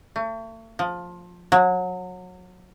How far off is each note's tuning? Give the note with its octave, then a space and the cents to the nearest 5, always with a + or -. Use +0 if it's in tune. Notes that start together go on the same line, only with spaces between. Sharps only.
A3 +40
F3 +15
F#3 -25